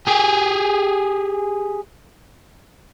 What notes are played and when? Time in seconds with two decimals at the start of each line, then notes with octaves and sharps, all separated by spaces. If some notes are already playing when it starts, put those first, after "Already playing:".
0.07 G4 G#4